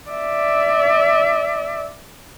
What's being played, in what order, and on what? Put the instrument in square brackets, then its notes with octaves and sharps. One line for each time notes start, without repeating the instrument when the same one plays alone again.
[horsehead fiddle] D5 E5